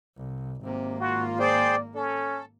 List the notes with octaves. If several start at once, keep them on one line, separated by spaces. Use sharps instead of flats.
C2
G#1 C3 A#3
F4 F#4
G#4 C5 D5 G5
C#4 A4